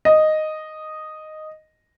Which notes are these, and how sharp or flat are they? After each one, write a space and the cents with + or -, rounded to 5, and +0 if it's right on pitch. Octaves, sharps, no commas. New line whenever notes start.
D#5 -5